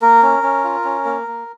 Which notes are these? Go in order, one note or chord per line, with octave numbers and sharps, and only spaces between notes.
A#3 A#4
C#4
C#4
F4
C#4
A#3
A#3